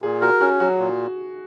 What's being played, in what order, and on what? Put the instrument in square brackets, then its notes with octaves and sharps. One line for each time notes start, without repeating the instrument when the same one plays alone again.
[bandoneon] A#2 [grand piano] G#4
[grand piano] F#4 [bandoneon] A#4
[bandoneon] C#4 [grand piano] F#4
[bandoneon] F#3 [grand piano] F#4
[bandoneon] A#2